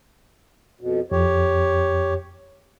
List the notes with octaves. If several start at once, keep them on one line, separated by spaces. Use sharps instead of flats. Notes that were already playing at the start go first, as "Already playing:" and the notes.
F2 B2
F2 G4 C#5